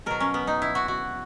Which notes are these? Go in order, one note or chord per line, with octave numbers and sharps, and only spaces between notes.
B2 F#3 A#4
C#4
B3
D#4
E4
F#4
F#4